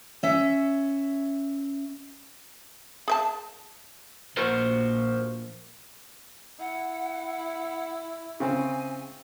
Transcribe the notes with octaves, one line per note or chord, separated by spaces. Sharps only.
C#4 E5
G#4 E5 A5
A#1 F#4 A#4 C5
E4 F#5
C#3 C4 G#5